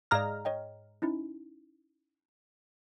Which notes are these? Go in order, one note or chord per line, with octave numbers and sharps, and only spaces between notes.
G#2 D5 F5 A#5 F6 F#6
C#5 D#5 G5
C#4 D#4 E4